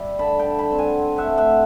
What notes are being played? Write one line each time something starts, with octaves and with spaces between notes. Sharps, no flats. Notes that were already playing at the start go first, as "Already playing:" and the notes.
Already playing: G3 E5
D3 A5 B5
G5 A5
D3
A5 B5
C4
F#5 G#5
C4
E5 F#5
A3
E5 F#5